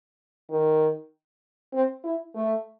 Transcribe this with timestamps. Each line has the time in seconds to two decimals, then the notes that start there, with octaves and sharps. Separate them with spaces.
0.50 D#3
1.73 C4
2.04 E4
2.34 A3